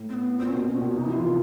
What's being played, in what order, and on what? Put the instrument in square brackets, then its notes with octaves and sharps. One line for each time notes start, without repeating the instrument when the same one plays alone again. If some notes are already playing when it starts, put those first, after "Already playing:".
Already playing: [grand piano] A2
[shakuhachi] C4
B3
[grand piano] A#2 [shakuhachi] C4
[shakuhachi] C#4
[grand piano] B2
[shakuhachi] C4
[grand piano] A#2 [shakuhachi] C#4
[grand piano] B2
[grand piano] C3 [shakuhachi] D#4
[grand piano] F3 [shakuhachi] E4
[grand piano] E3 [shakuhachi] F4
[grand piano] D#3